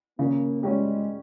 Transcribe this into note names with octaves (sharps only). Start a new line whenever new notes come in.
C#3 A#3
G3 G#3 C#4 G4